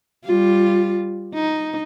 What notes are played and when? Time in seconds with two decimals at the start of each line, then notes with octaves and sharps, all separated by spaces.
0.24 G3 F4
1.34 D#4